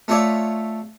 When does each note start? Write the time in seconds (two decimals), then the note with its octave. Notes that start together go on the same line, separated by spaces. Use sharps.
0.08 A3 F4 C#5 D5 E5